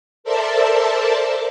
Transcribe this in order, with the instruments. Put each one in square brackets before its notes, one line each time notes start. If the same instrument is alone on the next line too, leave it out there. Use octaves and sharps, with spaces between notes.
[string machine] A4 A#4 C5 D5 E5 A5